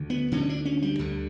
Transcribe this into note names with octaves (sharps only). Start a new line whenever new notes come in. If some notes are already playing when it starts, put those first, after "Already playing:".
Already playing: D2 D3
B3
D2 D3 C#4
D4
C#4
G3
D2 D3